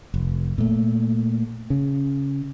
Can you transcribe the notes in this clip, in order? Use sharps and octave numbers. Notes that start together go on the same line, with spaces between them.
F1
A#2 A3
C#3